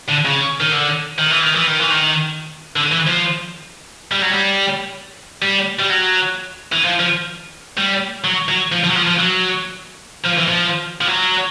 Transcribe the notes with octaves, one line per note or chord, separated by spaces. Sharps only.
D3
C#3
D#3
D3
D#3
E3
D#3
E3
D#3
E3
D#3
D3
E3
F3
G3
F#3
G3
G3
G3
F#3
E3
F3
F3
G3
F#3
F#3
F3
F3
F#3
F3
F3
F#3
F3
E3
F3
F3
F#3